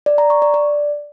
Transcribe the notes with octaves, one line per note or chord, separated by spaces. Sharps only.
D5
A#5
C#6
D5
D5